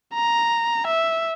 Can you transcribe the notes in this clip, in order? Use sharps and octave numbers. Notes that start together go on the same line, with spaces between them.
A#5
E5